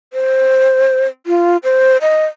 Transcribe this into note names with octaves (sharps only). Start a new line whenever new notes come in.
C5
F4
C5
D#5